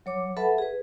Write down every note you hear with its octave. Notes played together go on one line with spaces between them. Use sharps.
F#3 C#5 D6
A4 B4 E5 F#5 A5 B5
G#4 B4